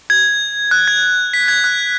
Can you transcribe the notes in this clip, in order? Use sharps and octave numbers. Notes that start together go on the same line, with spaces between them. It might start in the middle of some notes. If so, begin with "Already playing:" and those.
G#6
F#6
G#6
B6
G#6
F#6